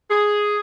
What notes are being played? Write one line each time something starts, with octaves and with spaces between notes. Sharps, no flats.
G#4